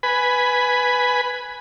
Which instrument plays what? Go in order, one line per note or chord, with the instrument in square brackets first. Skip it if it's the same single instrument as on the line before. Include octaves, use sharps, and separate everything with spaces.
[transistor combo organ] B4 G#5 B5